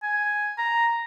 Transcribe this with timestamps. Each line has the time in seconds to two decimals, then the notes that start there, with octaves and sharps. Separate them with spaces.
0.03 G#5
0.58 A#5